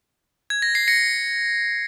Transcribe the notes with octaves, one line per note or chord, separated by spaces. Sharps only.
G#6
A#6
C7
A#6 C#7